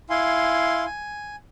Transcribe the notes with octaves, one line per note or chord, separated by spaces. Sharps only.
E4 F5 G#5 C6
G#5